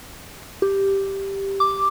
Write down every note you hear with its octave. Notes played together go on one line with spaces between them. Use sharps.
G4
D6